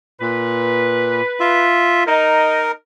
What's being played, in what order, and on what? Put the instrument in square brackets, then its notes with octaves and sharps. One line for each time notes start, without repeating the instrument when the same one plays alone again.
[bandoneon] A#2 [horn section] B4
[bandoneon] F4 E5
[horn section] D#4 [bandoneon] A#4